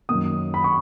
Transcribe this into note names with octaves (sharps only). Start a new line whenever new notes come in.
F#2 D#3 A#3 D#6
B5
C#6